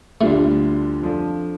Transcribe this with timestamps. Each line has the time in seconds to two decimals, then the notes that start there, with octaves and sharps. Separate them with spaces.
0.21 D2 D3 G3 A3 D4 F4
1.02 F2 F3 D4 A4